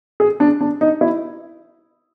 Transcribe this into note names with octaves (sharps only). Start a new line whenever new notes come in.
G#4
D4
D4
D#4
E4